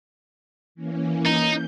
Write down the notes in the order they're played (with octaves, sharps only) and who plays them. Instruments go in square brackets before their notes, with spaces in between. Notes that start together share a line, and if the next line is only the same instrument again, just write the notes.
[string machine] E3 A#3 C#4
[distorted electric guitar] D#4 [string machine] G6